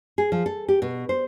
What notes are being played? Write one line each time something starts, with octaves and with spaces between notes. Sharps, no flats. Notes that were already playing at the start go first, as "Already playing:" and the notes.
G#4
F3
A4
G4
B2
C5